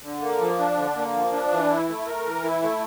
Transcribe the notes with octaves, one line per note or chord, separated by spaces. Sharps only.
D3
A#3
F3
D4
D3
A#3
F3
D4
E3
E4
A3
A#4
E3
E4
A3